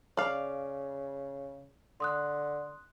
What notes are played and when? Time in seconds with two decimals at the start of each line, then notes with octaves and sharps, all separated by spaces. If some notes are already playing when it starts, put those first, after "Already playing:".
0.17 C#3 D5 F5
2.00 D3 C6 D#6 F#6